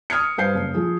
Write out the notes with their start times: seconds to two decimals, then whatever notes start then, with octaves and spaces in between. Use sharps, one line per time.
0.10 D#6 F6 G#6 C#7
0.38 G2 B4 C5 F5 G6 C7
0.55 F#1
0.74 F3 G#4